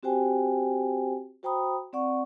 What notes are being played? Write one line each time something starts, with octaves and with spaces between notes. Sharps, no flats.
C4 F#4 G4 C5 G5 G#5
F#4 C5 G5 A#5 B5 D#6
C4 D5 F#5 C#6